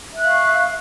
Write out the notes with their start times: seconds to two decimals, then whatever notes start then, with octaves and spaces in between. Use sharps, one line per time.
0.12 E5
0.17 F#6
0.22 F5
0.27 C#6